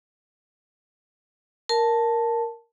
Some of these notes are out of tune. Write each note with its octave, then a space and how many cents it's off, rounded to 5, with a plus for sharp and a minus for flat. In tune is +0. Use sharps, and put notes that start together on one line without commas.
A#4 +0 A5 +0